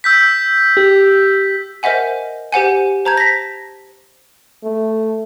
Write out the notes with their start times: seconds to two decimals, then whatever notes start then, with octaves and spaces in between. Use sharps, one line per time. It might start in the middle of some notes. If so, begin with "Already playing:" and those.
0.04 E6 G6 B6
0.77 G4
1.83 A#4 C5 D#5 E5 F#5 G#5
2.52 G4 C5 F#5 G#5
3.05 C5 A5 A#5 G6 G#6
3.17 A#6 B6
4.64 A3